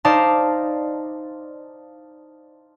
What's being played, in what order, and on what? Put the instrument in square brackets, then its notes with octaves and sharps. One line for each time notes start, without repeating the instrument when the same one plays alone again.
[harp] D#4 C5 D5 F5 A5